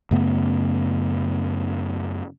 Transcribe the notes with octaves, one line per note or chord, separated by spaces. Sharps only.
F#2 C#3 A3 B3